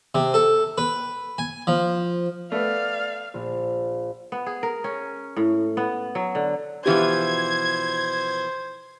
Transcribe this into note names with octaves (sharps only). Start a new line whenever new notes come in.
C3
A4
B4
G#5
F3
A3 B3 D5 F5
A#1
B3
G#4
A#4
C#4
A2
B3
F#3
D3
B2 E3 F3 G4 C5 G#6